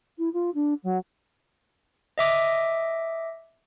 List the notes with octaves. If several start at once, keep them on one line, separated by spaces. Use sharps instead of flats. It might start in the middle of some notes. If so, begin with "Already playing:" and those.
E4
F4
D4
F#3
D#5 E5 D6